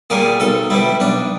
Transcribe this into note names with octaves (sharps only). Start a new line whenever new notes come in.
A#2 G3 A#3 G#4
B1 A4
B2 G3 E4
B1 D4